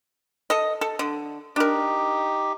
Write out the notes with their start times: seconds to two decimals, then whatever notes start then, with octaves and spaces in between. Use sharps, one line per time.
0.50 A4 D#5
0.81 A4
0.99 D3
1.56 D4 D#4 G4 A#4